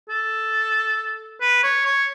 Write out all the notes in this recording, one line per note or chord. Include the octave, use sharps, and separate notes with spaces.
A4
B4
C#5
C#5